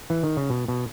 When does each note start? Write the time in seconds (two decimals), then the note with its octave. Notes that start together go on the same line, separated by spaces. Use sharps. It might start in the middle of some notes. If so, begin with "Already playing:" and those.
0.10 E3
0.23 D#3
0.37 C#3
0.50 B2
0.68 B2